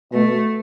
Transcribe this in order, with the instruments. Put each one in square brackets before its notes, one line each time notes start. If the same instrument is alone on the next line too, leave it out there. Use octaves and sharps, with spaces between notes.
[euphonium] B2 [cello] A3